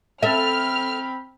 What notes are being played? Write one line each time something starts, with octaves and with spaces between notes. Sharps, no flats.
C4 A4 E5 B5 F6